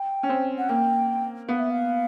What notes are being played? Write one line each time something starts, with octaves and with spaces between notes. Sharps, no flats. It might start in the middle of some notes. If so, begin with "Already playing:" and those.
Already playing: G5
C#4
C4
F#5
A#3 G5
B3 F5
E5
F5